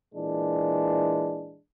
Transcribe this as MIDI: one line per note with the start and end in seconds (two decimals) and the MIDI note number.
0.14 1.59 46
0.14 1.59 52
0.14 1.59 56
0.14 1.59 62